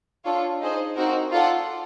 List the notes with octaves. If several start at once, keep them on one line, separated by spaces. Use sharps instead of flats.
D4 F4 A4 C#5
D#4 G#4 C5 D#5
C4 D#4 F#4 A#4
F4 A4 D5 F#5